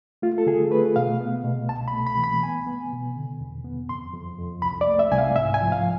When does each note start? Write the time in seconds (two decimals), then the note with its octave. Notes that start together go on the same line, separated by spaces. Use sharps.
0.22 A3 F4
0.38 A4
0.46 D3 G#4
0.71 A3 B4
0.96 B2 F5
1.21 B3
1.44 B2
1.69 C2 A5
1.88 B5
1.93 A3
2.07 B5
2.18 E3
2.24 B5
2.43 B3 G#5
2.67 B3
2.92 B2
3.16 D3
3.40 E2
3.65 B3
3.89 F2 C6
4.14 F2
4.39 F2
4.62 C2 B5
4.81 D5
4.87 A3
4.99 E5
5.12 C2 G#5
5.18 F5
5.36 G#2 E5
5.54 G#5
5.61 F3
5.72 F5